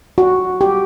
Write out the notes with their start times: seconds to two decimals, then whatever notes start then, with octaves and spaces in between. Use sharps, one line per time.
0.18 F#4
0.61 G4